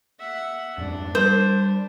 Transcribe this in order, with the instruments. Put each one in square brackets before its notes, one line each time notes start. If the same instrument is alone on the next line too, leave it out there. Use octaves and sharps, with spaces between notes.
[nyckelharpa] E5 F#5
[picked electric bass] F2 G#2 [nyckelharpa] D4
[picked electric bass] G3 [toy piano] A#4 [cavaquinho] C5